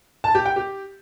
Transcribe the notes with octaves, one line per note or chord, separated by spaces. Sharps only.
A5
G4
G5
G4